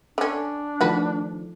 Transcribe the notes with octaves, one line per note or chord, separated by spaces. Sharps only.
D3 C#4 D4
D#3 F3 A3 F#4 B4